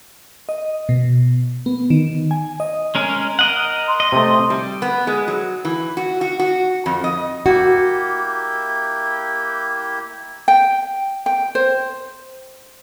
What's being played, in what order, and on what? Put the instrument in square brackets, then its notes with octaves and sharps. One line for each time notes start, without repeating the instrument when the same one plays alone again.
[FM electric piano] D#5
B2
B3
D#3
G#5
D#5
[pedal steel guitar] G#3 C#4 A#4
A#4 D#5 F#5
[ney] C6
[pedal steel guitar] D#5
[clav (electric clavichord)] C3 A3
[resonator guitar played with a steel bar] G3
B3
G#3
F#3
E3
F#4
F#4
F#4
F2
D#5
[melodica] A#3 E4 G4 [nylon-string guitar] F#4
[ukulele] G5
G5
C5